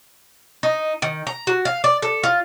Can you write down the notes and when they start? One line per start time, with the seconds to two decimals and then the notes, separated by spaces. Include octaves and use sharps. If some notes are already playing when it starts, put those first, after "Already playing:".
0.63 D#4
1.02 D#3
1.27 A#5
1.47 F#4
1.65 F5
1.84 D5
2.02 A4
2.23 F4